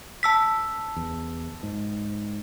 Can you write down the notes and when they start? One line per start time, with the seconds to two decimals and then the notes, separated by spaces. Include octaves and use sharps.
0.23 A5 E6 B6
0.96 E2
1.63 G#2